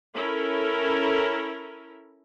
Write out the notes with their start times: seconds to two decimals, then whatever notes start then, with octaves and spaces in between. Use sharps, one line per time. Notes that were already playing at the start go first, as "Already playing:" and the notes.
0.14 C#4 E4 A4 A#4